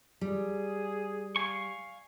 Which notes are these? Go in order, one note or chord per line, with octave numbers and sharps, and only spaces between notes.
G3 G#4
F5 G#5 C#6